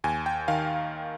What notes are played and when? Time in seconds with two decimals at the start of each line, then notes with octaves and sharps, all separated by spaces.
0.04 D#2 G#5
0.26 G5
0.48 D#3 F5